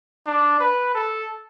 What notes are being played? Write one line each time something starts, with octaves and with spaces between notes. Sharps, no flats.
D4
B4
A4